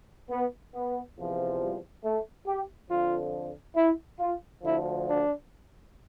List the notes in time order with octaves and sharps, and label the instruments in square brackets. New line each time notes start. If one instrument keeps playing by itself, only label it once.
[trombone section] B3
B3
E2 C3 F3
G3
A3
G4
F2 D3 F3 F4
E4
F4
D2 D3 F3 E4
D4